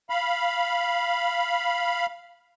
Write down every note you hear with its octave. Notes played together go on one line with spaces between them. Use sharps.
F5 B5